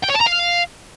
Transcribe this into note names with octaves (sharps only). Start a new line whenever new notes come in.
G5
C#5
A5
A#5
F5